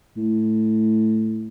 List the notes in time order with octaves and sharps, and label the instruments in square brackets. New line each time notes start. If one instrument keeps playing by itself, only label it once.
[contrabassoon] A2